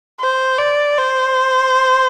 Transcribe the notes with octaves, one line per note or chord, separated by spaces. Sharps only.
C5
D5
C5